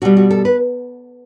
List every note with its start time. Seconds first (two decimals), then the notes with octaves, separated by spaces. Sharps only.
0.02 B2 G3 F#4
0.17 F#4
0.30 A4
0.45 B4